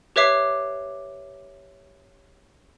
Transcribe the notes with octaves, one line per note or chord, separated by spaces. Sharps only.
G4 B4 C#5 E5 D6 C7